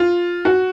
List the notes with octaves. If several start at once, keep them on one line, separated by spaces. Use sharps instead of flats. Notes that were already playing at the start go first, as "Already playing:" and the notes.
Already playing: F4
F#4